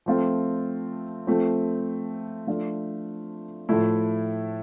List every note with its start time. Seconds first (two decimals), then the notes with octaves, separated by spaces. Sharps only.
0.06 F3 A3 C4 F4
1.27 F3 A3 C4
2.47 F3 A3 D4 F4
3.69 A2 F3 A3 E4